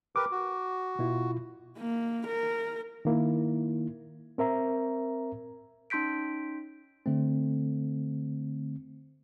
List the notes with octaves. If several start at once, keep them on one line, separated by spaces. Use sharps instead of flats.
G4 A#4 B4 D6
F#4
B2 E4 F4
A#3
A#4
D#3 A#3 E4
C4 A#4 E5 A#5
C#4 D#4 C6 G6 B6 D7
D3 A3 C4